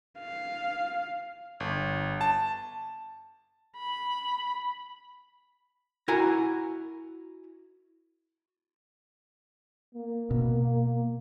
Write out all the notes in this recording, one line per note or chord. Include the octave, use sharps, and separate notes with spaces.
F5
G1
A5
B5
E4 F#4 A#4 G#5 A#5
A#3
B2